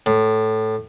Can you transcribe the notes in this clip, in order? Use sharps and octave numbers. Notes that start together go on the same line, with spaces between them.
A2